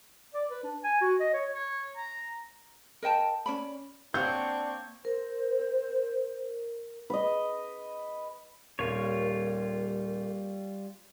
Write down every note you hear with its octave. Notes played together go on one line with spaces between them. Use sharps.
D5
B4
D4
G#5
F#4
D#5
C#5
C#5
A#5
A#4 D#5 G5 A5
C#4 D5 B5
A#3 C4 D4 C#5 F#5 C#6 G6
A#4 C5
B4 D#5
D#1 G3 F4 A#4 C#5